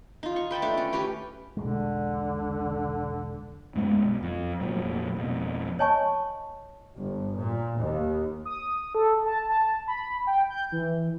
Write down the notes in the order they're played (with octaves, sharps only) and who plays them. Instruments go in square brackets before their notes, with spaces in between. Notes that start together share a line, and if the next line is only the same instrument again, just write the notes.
[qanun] D#4 F4
C#6
B4 G5 A5 B5
A3 D4 C#5
C#4
G4 B4 C#5 G5
[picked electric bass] E1 B1 G#3 [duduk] D3
[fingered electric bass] F#2 G#3 A#3 B3
B1
F2
F1 F2 A#2 F#3
F2 B2
[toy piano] C#5 D#5 G#5 A5 C#6
[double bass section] G1
A#2
D#2
[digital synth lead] D#6
A4
A5
A5
B5
G5
G6
E3